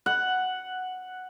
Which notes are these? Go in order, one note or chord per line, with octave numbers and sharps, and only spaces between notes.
F#5